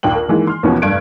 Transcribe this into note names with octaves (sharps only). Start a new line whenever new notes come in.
A#1 D#2 G5 F#7
A#4
D#3 E3 G#3 A#3
C6 F6
D#2 B2 E3 F3 B3 C#4
F1 G2 F#6 G#6 D7